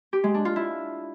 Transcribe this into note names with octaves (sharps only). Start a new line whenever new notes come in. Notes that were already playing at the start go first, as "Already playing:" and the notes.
G4
G#3
D4
F4
E4